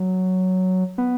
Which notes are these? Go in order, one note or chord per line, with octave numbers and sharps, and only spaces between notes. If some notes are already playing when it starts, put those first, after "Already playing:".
Already playing: F#3
B3